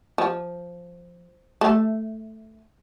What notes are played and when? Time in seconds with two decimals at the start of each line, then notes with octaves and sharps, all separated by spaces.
0.18 F3
1.61 A3